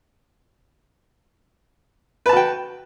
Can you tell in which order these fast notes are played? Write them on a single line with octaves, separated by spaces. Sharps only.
B4 A5 F#4 G5